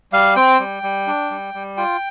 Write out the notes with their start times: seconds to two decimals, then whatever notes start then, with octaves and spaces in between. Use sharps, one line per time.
0.13 G3 F5
0.36 C4 G5
0.60 G3
0.83 G3
1.07 D4
1.30 G3
1.54 G3
1.77 F4 G5